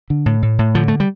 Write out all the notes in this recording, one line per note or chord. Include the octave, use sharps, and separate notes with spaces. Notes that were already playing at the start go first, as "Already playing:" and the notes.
D3
A2
A2
A2
D3 F3
A3
G3